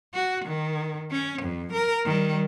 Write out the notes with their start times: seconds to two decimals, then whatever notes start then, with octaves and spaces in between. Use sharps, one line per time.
0.14 F#4
0.45 D#3
1.11 C#4
1.42 F2
1.73 A#4
2.05 D#3 G3